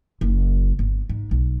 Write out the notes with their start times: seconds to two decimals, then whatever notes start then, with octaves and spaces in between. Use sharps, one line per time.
0.21 F#1
0.79 G1
1.09 G#2
1.31 B1